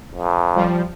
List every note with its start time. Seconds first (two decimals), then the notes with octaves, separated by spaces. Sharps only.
0.15 F2
0.55 F3 G3